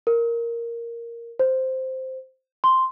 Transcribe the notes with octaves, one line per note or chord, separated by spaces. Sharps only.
A#4
C5
C6